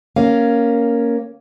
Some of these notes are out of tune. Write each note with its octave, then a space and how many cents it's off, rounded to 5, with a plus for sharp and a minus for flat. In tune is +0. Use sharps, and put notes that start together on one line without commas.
A#3 +0 C#4 +0 F5 +0